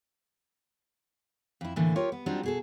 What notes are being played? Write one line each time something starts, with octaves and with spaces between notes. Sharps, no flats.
F2 E4
A2 D3 E3 A#3
F4 G4 A#4 C#5
B3
F#3 G3 C4 D4 D#4 F4
B2 G#4 A4